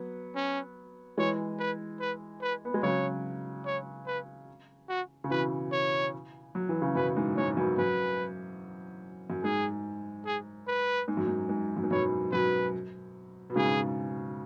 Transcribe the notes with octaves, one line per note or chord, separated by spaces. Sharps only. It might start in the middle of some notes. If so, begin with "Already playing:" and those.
Already playing: F#3 B3
C#4
E3 G#3 C#5
B4
B4
B4
B3
G#3
C#3 F#3 C#5
C#5
B4
F#4
C#3
B2 E3 B4
C#5
F#3
E3
C#3
F#2 B2 B4
G#2
G#2 C#5
F#2 B2
F#2 B4
F#2
G#2 G#4
G#4
B4
G#2
F#2
G#2
G#2
F#2
G#2
F#2 B2 C#5
F#2 B2 B4
B2
G#2 C#3 G#4